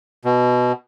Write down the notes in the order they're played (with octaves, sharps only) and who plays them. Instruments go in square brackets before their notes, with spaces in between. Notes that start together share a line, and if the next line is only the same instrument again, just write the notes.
[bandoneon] B2